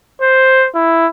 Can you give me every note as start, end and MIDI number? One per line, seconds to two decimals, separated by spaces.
0.22 0.68 72
0.75 1.07 64